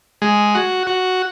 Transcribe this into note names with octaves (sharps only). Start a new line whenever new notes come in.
G#3
F#4
F#4